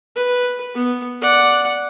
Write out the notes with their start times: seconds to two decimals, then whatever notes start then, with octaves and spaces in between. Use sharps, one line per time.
0.16 B4
0.75 B3
1.22 D5 F#5